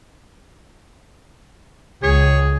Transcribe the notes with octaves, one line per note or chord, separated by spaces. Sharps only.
C#2 G#4 C#5